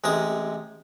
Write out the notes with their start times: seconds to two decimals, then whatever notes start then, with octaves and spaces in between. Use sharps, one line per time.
0.04 A1 C3 G#3 D#6